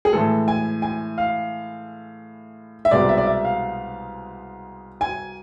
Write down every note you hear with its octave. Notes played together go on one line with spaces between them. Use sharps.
G#4
A2 E3 G#3 A4
G#5
G#5
F5
E5
C2 B2 G#3 C4 D5
E5
D5
E5
F5
G#5